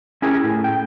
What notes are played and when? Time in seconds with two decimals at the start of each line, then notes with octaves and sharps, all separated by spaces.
0.22 C#4 E4 G4 G#4 A#4
0.44 A2
0.64 G5